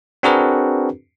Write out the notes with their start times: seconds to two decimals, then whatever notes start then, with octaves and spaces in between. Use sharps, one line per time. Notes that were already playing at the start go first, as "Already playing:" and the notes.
0.23 C4 D4 F#4 G#4 A#4 B4